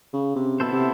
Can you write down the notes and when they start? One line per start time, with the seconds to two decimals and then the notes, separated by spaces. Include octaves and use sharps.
0.13 C#3
0.36 C3
0.60 B2 B3 E4 A4 C5
0.72 C3